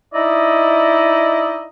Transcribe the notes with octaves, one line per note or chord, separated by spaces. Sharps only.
D#4 E4 D5 D#5